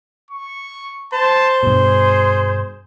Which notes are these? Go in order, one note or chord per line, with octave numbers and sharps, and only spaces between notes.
C#6
C5 A5
G2 B2 G#4